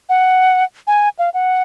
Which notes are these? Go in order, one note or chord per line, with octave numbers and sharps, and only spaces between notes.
F#5
G#5
F5
F#5